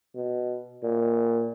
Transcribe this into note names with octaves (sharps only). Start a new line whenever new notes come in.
B2
A#2